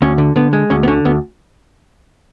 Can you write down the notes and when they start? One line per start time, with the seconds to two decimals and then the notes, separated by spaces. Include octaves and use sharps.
0.02 D2 C#4
0.18 D3
0.36 D3 B3
0.53 G#3
0.70 D2 C#4
0.83 B3
0.88 D3 C#4
1.05 D2 B3